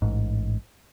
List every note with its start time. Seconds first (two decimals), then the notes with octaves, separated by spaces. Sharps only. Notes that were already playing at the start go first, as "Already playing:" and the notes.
0.02 A1 G#2